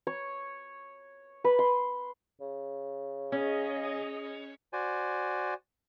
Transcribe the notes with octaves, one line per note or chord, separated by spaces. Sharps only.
C#5
B4
C6
C#3
C#4 G#4 D#5
F#4 C5 D5 G#5